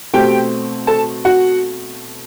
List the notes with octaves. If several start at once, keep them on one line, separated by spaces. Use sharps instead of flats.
B2 A3 C4 G4 G5
A4 A5
F#4 F#5